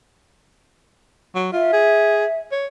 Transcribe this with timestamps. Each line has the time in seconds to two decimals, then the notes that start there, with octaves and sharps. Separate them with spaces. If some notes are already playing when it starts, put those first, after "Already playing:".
1.35 F#3
1.53 F4 E5
1.73 G#4
2.52 C#5